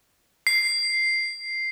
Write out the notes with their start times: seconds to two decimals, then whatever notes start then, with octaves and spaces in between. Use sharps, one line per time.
0.47 C7